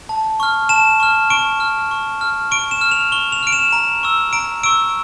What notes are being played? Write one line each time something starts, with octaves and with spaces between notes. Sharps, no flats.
A5
C#6 F6
A5 E7
C#6 F6
C#6 D7
F6
C#6
F6
C#6 D7
E7
F6
F7
C#6 G7
F7
F6 D7
E7
A#5
C#6 E6
A#5 D7
C#6 E6 D7